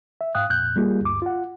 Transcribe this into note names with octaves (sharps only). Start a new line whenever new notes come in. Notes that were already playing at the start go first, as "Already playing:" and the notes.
E5
G#2 F5 G5 D#6 F#6
F2 A#2 F#6 G6
G3 A#3 F4 G4 G#4
D2 G2 D6
F4 F#5